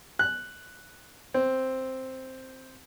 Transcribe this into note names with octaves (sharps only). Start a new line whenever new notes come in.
F#6
C4